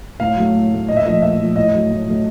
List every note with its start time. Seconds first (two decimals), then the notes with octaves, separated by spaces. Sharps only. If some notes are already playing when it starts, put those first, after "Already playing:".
0.20 A2 F5
0.36 F#3 A3
0.54 A2
0.71 F#3 A3
0.88 A#2 D#5
0.97 E5
1.05 F3 A3 D#5
1.22 A#2 E5
1.39 F3 A3
1.56 A2 D#5
1.73 F#3 A3
1.91 A2
2.08 F#3 A3